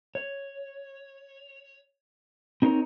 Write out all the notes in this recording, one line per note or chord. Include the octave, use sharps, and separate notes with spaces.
C#5
C4 D#4 A#4 C5 C#5